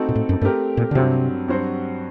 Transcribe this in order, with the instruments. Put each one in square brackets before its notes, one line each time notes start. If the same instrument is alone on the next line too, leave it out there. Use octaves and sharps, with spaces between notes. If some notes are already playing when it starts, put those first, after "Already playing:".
Already playing: [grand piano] A3 C4 D#4 F#4 A4
[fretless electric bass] A#2
A2
F#2
[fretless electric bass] G2 [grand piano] A3 C4 G4 A#4
[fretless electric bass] A#2
D3
[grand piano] G2 F#3 C4 [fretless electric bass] C3
[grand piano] G2 F#3 C4 F#4 C5